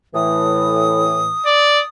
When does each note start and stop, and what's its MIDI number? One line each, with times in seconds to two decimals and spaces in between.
0.15 1.36 45
0.15 1.36 52
0.15 1.89 87
1.46 1.81 74